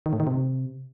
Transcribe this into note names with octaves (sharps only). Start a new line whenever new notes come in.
D#3
A2
D#3
C3